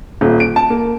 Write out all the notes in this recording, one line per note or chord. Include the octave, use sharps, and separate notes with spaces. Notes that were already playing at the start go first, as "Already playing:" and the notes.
D#1
D7
A5
A#3